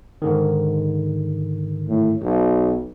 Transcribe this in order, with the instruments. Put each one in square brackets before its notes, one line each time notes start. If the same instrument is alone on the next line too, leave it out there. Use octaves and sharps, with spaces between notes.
[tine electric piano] G#2 D3 D#3
[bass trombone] A2
B1